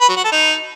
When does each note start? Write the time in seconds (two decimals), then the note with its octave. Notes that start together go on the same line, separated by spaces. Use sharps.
0.01 B4
0.09 F#3
0.16 F#4
0.24 A4
0.32 D#4